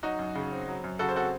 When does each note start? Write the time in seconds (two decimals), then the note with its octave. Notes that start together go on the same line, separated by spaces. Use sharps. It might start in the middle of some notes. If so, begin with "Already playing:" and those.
0.03 F#3 D#4 F#4
0.19 F#2
0.35 C#3
0.52 C4
0.68 F#3
0.84 F#2
0.99 C#3 F#4 A4
1.09 C5
1.15 C4 F#4 A4